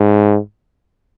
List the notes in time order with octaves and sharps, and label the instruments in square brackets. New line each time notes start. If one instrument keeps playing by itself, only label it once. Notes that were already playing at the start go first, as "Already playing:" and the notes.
Already playing: [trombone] G#2